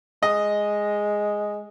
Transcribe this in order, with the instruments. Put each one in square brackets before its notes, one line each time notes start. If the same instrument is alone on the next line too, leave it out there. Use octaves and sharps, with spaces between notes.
[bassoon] G#3 [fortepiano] D#5